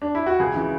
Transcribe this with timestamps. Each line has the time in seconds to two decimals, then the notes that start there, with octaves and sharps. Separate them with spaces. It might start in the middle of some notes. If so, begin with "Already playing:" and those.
0.02 D4
0.15 E4
0.26 F#4
0.39 C#2 G#4
0.55 C#3 E3